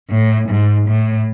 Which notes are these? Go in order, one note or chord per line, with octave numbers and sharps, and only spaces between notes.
A2
G#2
A2